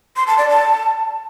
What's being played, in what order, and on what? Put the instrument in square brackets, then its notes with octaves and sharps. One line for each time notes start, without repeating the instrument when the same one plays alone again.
[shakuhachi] C6
A5
D5
A5